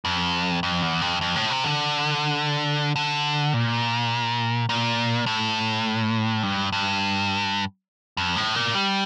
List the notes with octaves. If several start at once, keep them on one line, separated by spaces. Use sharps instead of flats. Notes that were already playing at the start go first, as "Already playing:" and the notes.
F2
F2
E2
F2
F2
A2
C3
D3
D3
A#2
A#2
A2
G2
G2
F2
A2
A#2
G3